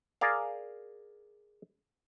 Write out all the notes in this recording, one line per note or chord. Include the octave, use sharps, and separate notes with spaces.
G#4 A#4 D5 F5